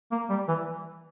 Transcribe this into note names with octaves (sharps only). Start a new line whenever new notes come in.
A#3
G3
E3